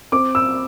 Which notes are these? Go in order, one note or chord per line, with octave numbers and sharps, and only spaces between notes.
C4 D6
E6